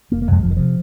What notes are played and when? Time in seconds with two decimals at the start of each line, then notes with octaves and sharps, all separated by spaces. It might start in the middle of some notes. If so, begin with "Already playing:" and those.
0.11 F1 A#3
0.22 A#3
0.28 F2 C3 G#3
0.43 F1 F3
0.51 D#3
0.57 C3 F3